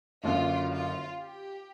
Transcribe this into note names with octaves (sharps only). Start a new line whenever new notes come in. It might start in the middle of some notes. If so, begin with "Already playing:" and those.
F#1 F#2 D3 F4
F4
G4